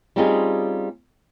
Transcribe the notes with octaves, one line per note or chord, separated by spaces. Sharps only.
G3 C4 C#4 D#4 F4 G#4